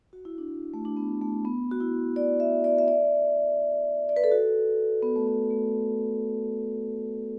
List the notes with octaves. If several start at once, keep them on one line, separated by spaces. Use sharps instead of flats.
F#4
E4
D4
A3
D4
B3
A3
B3
F#4
E4
D5
E5
D5
E5
D5
D5
B4
A4
F#4
B3
A3
B3
A3